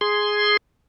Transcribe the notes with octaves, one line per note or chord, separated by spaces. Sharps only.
G#4 C6